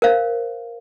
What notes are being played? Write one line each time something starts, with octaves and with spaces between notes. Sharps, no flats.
A#4 C5 F5